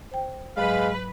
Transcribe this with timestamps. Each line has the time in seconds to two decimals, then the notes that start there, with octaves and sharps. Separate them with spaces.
0.11 C5 G5
0.57 G#2 F#3 G#3 B4 F5